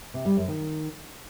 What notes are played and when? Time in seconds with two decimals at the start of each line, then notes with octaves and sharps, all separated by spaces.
0.14 C3
0.25 G3
0.37 F#2
0.48 D#3